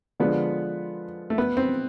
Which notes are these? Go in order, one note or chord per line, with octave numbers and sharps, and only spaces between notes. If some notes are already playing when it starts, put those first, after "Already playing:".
D3 F3 G#3 B3 D4 F4
A3
B3
C4